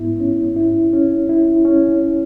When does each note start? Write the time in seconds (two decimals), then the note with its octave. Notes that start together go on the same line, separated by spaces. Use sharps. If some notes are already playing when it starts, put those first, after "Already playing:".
Already playing: G#2 B3 E4
0.20 C#4
0.57 E4
0.93 C#4
1.29 E4
1.65 C#4